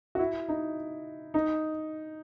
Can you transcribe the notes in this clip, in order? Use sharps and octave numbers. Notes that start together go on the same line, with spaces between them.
F#4
E4
D#4
D#4